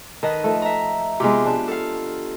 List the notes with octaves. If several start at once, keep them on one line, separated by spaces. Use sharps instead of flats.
D#3 B4 D#5 A5
F3 A3
E5 A#5
C3 G#3 B3 F4 G4
D4
A4 F5